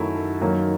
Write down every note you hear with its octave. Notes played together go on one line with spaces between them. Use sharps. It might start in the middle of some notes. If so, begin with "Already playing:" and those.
Already playing: F#2 D#3 F#3 A3 E4
A4
F#2 D#3 F#3 A#3